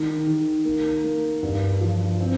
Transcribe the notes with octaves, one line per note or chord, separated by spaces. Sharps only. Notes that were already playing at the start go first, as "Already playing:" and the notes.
Already playing: D#3
D#3
A#3
A#3
G2
F3
C4